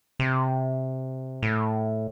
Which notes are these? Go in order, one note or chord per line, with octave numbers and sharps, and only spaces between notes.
C3
A2